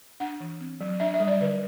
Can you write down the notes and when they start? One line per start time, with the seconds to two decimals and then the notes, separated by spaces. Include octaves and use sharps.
0.20 D4 F#5
0.40 E3
0.60 C4
0.81 F#3
1.00 D4 E5
1.14 E5
1.20 G3
1.27 D5
1.41 D3 B4